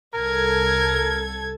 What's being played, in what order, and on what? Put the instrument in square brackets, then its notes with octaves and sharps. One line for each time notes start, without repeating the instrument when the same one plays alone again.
[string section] C2 A4 G#6 [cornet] A#4